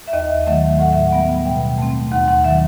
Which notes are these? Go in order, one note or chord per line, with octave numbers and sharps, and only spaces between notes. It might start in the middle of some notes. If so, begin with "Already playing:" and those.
E5
D#2 D#5
D#3 F#3 A3 E5
A2 F#5
E5
F#5
G3 B3
B2 G5
A3 C4
D#2 F#5
F#5
D#3 F#3 E5